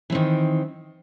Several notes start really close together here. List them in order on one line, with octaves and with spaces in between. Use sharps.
E3 C4 D#3